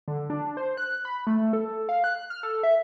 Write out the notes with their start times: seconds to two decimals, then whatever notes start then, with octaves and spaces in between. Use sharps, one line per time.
0.08 D3
0.30 D4
0.57 C5
0.77 F#6
1.05 B5
1.27 A3
1.53 A4
1.89 F5
2.04 F#6
2.30 F6
2.43 A4
2.63 E5